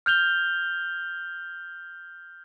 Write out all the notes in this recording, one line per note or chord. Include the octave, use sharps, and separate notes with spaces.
F6 G6 F7 G7